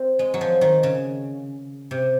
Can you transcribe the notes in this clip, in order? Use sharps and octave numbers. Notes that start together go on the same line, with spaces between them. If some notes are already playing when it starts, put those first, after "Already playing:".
Already playing: C4
G#3
F#3
F3
D#3
C#3
C3